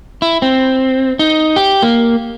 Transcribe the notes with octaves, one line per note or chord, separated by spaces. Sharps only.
E4
C4
D#4
G4
A#3